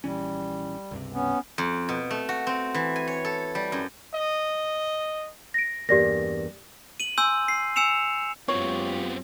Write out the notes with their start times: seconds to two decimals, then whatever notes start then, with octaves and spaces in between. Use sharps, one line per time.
0.04 A#1 E3 G3 C#4
0.91 C#2 G2 C3
1.13 B3 C#4
1.58 F2
1.89 B2
2.11 A3
2.29 F#4
2.47 C4
2.74 E3
2.96 G#5
3.08 C#5
3.25 A4
3.55 G3
3.72 F#2
4.14 D#5
5.54 A#6 D7
5.89 E2 G2 A#3 G4 D5 A#6
7.00 D#7 F#7
7.18 G#5 C6 E6 G6
7.48 C7
7.76 G#5 E6 C#7 E7 F7
8.48 F#2 G#3 B3 C4 F4 G4 C#5